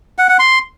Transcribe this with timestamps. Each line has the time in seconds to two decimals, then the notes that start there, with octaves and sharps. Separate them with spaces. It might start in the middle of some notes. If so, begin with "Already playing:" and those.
0.18 F#5
0.29 F#5
0.39 C6